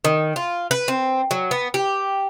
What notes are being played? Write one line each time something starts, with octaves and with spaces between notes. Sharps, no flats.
D#3
F4
B4
C4
F#3
B3
G4